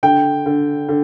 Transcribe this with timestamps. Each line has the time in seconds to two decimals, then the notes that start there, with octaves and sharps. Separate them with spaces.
0.03 D3 G5
0.46 D3
0.89 D3